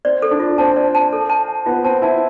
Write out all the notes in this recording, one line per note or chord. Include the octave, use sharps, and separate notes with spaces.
C4 D5
A4
D4
F4
C4 A5
D5
A5
A4
A5
A5
B3 F4
C4 A5
E4 A5